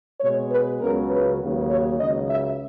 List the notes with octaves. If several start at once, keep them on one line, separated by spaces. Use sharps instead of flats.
B2 G#3 B3 C#5
B4
C#2 C#3 F#3 A#4
B4
D#2 C#3 F#3
C#5
C#2 C#3 F#3 D#5
E5